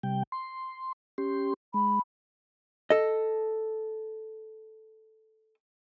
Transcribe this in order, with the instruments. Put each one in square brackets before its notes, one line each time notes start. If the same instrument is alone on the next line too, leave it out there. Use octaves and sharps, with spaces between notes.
[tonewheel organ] C3 G3 G5
C6
C#4 G4 C6
[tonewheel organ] G#3 [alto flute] B5
[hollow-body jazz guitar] A4 D#5